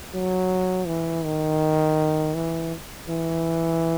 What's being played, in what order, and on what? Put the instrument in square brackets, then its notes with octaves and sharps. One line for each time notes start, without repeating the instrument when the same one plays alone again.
[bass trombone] F#3
E3
D#3
E3
E3